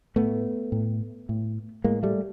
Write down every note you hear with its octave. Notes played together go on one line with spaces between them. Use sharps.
A2 A3 B3
A2
A2
A2 G#3 A#3
G3 A3